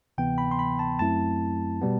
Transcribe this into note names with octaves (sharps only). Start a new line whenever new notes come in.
D2 C3 E3 B3 G5
B5
C6
B5
A5
F#2 F#3 A3 C4 E4 A5
B2 G3 B3